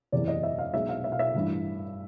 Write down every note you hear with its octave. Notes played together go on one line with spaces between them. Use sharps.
F#1 E2 C3 E3 D5
D#5
E5
F5
B1 B2 G#3 E5
F5
E5
F5
E5
A1 G2 E3